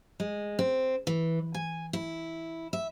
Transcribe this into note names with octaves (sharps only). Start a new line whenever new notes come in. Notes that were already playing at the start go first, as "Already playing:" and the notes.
G#3
C4
E3
G#5
E4
E5